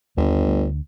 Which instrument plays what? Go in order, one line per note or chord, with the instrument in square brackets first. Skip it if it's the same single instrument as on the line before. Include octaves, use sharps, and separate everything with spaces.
[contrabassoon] G1 [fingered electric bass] D#2 G3
[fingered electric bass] D2